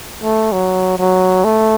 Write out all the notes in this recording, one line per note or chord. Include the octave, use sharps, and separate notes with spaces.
A3
F#3
F#3
A3